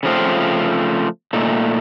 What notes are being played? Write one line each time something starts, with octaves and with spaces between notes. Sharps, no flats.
C#3 F3 A3 C4 F4
A#2 A3 D#4